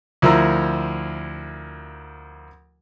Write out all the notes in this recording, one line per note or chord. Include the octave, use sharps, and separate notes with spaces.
D2 F3 E4 A#4 A#5 E6